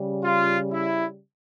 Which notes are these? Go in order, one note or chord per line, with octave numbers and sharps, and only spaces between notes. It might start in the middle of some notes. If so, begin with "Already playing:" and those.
Already playing: C#3 G3
F4
E4